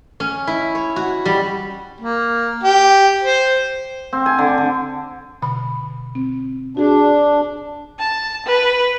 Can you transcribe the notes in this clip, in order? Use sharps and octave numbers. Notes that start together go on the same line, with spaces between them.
C#4
E4
C#5
F#4
G3
A#3
G4
C5
C4
G#5
D3
D3
B2 D3 B5
C4
D4 F#4 G#4
A5
B4